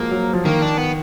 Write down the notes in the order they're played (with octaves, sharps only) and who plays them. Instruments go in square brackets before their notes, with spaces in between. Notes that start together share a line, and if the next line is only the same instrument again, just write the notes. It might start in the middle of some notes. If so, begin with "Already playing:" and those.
Already playing: [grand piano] F3 F#3 G#3 [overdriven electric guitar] A#3
[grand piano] F#3
F3
[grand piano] D#3 [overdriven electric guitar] A#3
[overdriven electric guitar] D4
B3